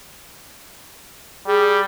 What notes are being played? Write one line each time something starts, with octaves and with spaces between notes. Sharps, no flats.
G3 G#4